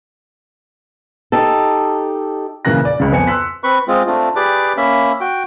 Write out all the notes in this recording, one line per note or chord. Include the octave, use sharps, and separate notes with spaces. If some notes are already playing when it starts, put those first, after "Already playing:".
D#4 G4 A4
A#2 C#3 E3 A#3 F#6 A#6
D5
C#2 C#3
F2 B3 G#5 C#7
C6 E6 F#6 B6
C4 B4 B5 C#6
G#3 C4 F4
A3 C4 D4 F4
G4 G#4 B4 D5 D6
A#3 C#4 E5 B5
F#4 G5